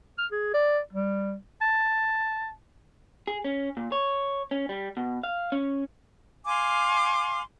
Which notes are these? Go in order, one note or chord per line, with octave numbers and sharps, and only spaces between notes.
F6
G#4
D5
G3
A5
G#4
C#4
A#2
C#5
C#4
G3
B2
F5
C#4
F5 G#5 C6 D6